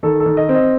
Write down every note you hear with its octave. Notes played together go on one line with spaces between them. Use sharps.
D#3 A4
A4
D#3
D#5
C4
D#5